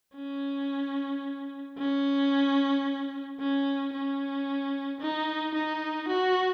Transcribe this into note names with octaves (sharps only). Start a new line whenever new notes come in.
C#4
C#4
C#4
C#4
D#4
D#4
F#4